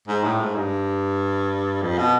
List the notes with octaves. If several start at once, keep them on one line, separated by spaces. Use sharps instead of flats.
G#2
A2
G#2
G2
F2
B2